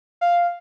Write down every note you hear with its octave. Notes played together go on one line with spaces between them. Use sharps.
F5